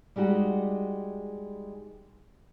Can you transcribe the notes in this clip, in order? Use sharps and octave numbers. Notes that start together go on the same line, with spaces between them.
G3 G#3 D#4 F#4 G4